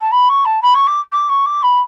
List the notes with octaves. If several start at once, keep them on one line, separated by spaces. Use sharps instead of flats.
A5
B5
C#6
A5
B5
C#6
D6
D6
C#6
D6
B5